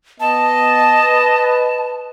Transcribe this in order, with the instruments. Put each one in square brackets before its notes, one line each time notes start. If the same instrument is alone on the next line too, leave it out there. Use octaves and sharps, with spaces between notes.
[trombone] B3 [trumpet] D#5 [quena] A5
[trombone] B4